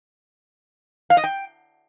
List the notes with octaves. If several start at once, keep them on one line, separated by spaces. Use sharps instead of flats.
F5
D#5
G5